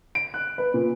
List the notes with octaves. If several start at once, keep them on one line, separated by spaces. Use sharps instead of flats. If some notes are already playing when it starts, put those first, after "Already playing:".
D7
F#6
B4
A#2